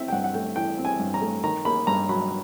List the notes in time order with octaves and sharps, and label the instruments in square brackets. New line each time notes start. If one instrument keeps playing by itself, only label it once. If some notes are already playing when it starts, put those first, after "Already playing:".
Already playing: [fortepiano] E3 C4 E5
G5
G2 F#5
F#5
A3 G5
E3 G5
C4
G#5
G2
A#5
A3
D#3 A#5
A#3 B5
G2 A#5
F#3 B5